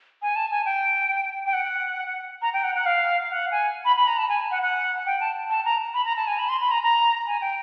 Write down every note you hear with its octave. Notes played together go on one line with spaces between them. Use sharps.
G#5
A5
G#5
G5
G5
F#5
A#5
G5
F#5
F#5
F5
F#5
G#5
B5
B5
A#5
A5
G#5
F#5
F#5
G5
A5
A5
A#5
B5
A#5
A5
G#5
B5
C6
B5
A#5
A#5
G#5
G5